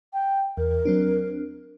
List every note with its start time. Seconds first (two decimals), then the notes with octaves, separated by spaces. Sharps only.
0.13 G5
0.57 E2 A#4
0.85 F#3 C4 D4